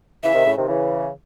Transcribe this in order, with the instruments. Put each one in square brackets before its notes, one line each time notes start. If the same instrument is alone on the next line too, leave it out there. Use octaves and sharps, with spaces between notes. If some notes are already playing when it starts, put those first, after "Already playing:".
[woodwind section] C#3 E3 [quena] E5
[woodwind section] C3 D#3
A2 C#3
C3 D#3
C#3 E3